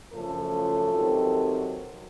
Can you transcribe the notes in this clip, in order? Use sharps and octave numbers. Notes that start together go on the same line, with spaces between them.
F#2 C#3 F3 A3 C#4 A4
C3 D#3 F#3